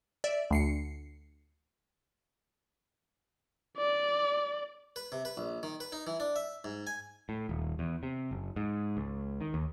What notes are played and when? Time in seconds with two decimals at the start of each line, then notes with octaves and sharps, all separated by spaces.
0.24 D5 E5
0.51 D2 C7 C#7
3.77 D5
4.96 B4
5.12 C3
5.25 B4
5.37 A#1
5.63 D#3
5.80 B4
5.92 D#4
6.07 E3
6.20 D4
6.36 E5
6.64 G#2
6.87 G#5
7.29 A2
7.49 D#1
7.79 E2
8.03 C3
8.31 F#1
8.56 G#2
8.97 C#2
9.41 D#3
9.54 D#2